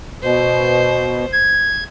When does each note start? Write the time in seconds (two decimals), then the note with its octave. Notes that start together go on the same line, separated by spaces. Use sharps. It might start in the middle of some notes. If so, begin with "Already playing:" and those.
0.23 B2 C5
1.32 G#6